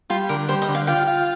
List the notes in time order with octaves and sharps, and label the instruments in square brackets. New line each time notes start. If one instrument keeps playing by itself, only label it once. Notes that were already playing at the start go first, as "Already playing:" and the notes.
[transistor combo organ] G3 [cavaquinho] F4
[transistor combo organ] D3 [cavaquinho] A#4
[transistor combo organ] G3 [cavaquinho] C5
[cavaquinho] D#5
[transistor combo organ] D3
[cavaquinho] F5
[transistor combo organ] F4 [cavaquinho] G5
[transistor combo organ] F4